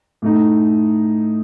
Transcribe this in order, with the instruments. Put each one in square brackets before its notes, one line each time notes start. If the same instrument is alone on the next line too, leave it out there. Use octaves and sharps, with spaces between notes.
[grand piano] A2 A3 D#4